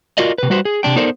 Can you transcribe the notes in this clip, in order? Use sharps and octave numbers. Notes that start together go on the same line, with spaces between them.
F4 F#4 A#4 D5 D#5
C3 B4
G3 F#4 B4 C5
G#4
C3 B3 D4 G5
B3 D#4 A4 A#4 C5 D5